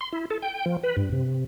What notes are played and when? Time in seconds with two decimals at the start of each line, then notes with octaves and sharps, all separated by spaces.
0.01 C6
0.13 E4
0.30 A4
0.42 G5
0.66 F3
0.83 B4
0.97 G2
1.12 C3